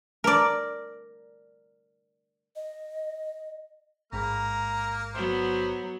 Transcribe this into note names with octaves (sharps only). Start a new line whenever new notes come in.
A#4 D5
D#5
A1 G#2 G#3 A#3 A#5 F6
F#3 B3 C5